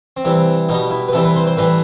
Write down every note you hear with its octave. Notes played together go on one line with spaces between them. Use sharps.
C4
C3 E3 G3
B2 G3 D#4
E4
B4
C3 E3 G3 A4
B4
C5
C5
A2 E3 G3 B4